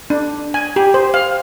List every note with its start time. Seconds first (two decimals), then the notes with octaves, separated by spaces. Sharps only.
0.10 D4
0.54 G#5
0.76 G4
0.94 C5
1.14 F5